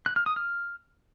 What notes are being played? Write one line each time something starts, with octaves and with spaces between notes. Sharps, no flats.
F#6
F6
D#6
F6